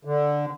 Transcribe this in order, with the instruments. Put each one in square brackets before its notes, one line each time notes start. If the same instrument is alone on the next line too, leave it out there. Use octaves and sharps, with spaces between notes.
[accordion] D3